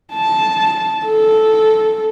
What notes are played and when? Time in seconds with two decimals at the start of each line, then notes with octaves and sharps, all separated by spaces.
0.13 A5
1.06 A4